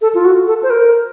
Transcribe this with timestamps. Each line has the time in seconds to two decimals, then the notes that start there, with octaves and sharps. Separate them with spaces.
0.02 A4
0.15 F4
0.25 F#4
0.47 A4
0.63 C5
0.70 A#4